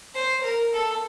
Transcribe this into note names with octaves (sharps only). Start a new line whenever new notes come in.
C5
A#4
A4